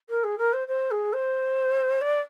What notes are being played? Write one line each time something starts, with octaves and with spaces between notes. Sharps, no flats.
A#4
G#4
A#4
C5
C5
G#4
C5
D5